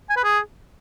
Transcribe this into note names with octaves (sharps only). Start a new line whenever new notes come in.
G#5
B4
G#4